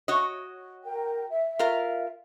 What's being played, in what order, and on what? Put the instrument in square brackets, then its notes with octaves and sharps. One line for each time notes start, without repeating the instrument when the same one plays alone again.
[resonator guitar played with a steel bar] F#4 C#5 D#5
[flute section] A#4 G5
E5
[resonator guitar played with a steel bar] F4 A#4 F5